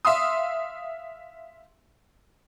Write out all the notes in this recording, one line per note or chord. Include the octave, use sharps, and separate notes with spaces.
E5 F5 C6 D#6